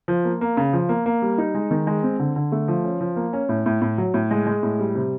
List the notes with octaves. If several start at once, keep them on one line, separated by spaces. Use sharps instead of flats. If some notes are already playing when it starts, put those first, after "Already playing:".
F3
A#3
A#3
C#3
F3
A#3
A#3
G3
D#4
G#3
D#3
G#3
C4
D3
D3
A3
F3
C#4
F3
A#3
C#4
A2
A2
A2
F#3
A2
G#3
G#3
A2
G3
C3